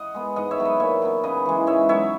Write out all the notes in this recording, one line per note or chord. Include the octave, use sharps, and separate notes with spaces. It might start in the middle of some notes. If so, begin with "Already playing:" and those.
Already playing: D#5 F#5
G#3 B3
G#2 D#5 F#5
C#5 E5
F#3 B3
B4 D#5
A#2 C#5 E5
F#3 B3
C#3 B4 D#5
E3 G#3
G#2 C#5 E5
F#3 B3 C#5 E5